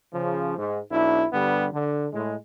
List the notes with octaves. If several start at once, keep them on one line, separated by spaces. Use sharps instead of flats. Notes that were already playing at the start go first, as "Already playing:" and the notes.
C#3 F3
G#2
B1 D4 E4
G2 D3 G3 B3
D3
A2 G#3